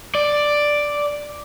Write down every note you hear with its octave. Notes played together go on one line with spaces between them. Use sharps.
D5